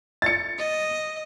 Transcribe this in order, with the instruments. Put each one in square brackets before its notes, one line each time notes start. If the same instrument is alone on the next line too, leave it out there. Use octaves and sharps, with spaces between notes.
[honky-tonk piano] A6 C#7
[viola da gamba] D#5